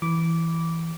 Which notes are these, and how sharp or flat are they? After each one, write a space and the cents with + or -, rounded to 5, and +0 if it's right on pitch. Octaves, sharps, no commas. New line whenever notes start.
E3 +0 B5 +0 D6 -15